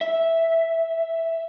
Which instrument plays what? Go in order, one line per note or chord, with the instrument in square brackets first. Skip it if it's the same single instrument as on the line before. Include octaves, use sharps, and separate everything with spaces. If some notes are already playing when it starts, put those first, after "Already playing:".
[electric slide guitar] E5